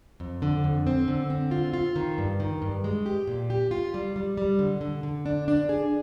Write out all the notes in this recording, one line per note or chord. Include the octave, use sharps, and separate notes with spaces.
F2
D3
F2
C4
D3
C4
F4
F4
D#3
G2
D#3
G2
G#3
G4
A#2
G4
F4
G3
G3
G3
D3
D3
D3
D4
D4
G#4